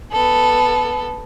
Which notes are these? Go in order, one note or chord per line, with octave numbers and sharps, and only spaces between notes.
B3 A4